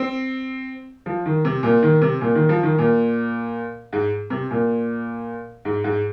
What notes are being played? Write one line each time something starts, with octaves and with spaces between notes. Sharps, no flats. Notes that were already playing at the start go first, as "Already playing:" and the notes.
Already playing: C4
F3
D#3
C3
A#2
D#3
C3
A#2
D#3
F3
D#3
A#2
G#2
C3
A#2
G#2
G#2